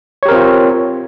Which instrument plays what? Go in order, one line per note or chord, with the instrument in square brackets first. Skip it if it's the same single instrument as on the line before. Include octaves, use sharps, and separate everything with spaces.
[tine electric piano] C#5
G4
A#4
C4
F4